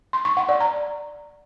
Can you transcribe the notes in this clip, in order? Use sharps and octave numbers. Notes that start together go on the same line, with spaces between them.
C6
C#6
F#5
D5
A#5